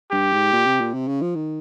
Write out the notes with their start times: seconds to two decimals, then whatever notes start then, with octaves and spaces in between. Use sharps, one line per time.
0.12 G2 G4
0.33 G#2
0.53 A#2
0.67 C3
0.81 A#2
0.94 C3
1.08 C#3
1.22 F3
1.35 D#3